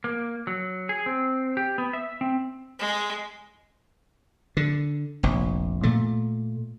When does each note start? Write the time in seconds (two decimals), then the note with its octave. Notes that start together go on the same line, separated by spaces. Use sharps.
0.04 A#3
0.47 F#3
0.89 G#4
1.06 C4
1.57 G4
1.78 B3
1.93 E5
2.21 C4
2.79 G#3
4.57 D3
5.23 F1 A#1
5.83 A#2 A3